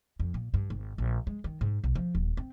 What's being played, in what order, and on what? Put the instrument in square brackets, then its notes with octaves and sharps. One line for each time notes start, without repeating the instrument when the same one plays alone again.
[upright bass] F2
A#2
G2
G#1
A#1
G#3
D#3
G#2
B1
F3
D#1
C4